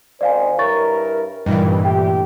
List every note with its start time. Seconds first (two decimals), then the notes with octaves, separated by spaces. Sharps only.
0.21 G#1 D#3 C5 D5 F5 G#5
0.59 G2 E4 A#4 C#5 C#6 A6
1.46 G2 A#2 D#3 E3 G3
1.85 A3 G4 G5